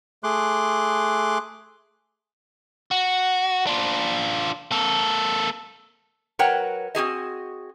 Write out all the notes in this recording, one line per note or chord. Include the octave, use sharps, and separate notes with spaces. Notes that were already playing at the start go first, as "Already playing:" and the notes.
A3 G#4 C6 D6 F#6
F#4
D4 F4
A#3 A4
F#3 A#4 B4 C#5 F#5 G5
C4 F#4 G#4 D#5